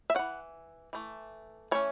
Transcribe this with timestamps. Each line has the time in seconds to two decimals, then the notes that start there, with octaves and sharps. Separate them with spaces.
0.10 E5
0.15 E3 C#4 F#5
0.93 E3 A3
1.71 E3 A3 C#4 C#5